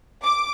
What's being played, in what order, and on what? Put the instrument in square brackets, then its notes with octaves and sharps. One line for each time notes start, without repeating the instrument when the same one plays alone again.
[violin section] D6